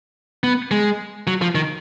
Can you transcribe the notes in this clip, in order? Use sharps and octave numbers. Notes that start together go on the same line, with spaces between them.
B3
G#3
F#3
F3
D#3